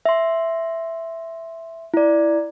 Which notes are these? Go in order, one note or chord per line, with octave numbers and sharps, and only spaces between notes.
E5 C6
E4 D5